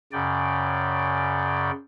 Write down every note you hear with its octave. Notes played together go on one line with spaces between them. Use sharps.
F#2 C#3 D5 G5